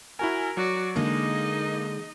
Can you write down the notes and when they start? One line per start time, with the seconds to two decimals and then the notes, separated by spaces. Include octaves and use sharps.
0.19 E4 F#4 A#4 G#5
0.57 F#3 F#4 D5
0.96 D3 G#3 A#3 D4 D#4 D#5